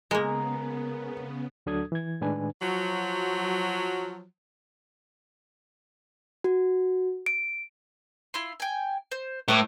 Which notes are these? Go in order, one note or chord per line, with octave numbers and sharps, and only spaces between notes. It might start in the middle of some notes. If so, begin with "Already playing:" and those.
C#3 G#3 A#3 B3 G#4 A#4 A#5
D2 F#3 D4 A4 D#6 G#6
E3 G#6
A2 D#3 G#3 D4 B4 G#5
F3 F#3
F#4
D7
E4 F4 C6
G5 G#5
C5
A2 B4 C#6 D6